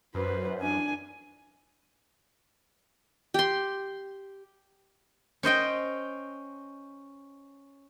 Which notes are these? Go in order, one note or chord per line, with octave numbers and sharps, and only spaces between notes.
F#2 B4 C5
D4 G#5
G4 C6
C#4 C5 D#5 G5